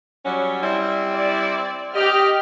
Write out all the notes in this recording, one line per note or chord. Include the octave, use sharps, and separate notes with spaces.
F#3 G3 C#4
G3 C4 E4
D5
G4 D#5 F6